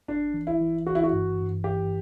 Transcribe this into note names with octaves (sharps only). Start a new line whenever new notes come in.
G1 D4
E3
E4
E3
E3 F#4
E4
F#4
G2
G2
E3 G4